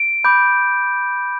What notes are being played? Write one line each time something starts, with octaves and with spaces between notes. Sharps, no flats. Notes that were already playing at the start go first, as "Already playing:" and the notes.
Already playing: D7
B5 D6 G6